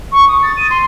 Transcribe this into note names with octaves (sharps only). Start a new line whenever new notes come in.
C#6
D#6
A6
D#7
C6